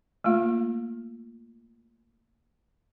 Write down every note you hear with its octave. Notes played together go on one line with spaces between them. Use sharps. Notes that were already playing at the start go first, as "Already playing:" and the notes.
A3 A#3 F4